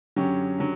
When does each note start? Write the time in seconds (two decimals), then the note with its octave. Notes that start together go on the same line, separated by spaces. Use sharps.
0.16 F#2 D3 F#3 C#4 G4
0.58 D3 F#3